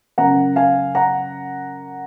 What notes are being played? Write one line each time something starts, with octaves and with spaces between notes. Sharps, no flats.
F#2 C#3 F#5 A#5
F5 G#5
F#5 A#5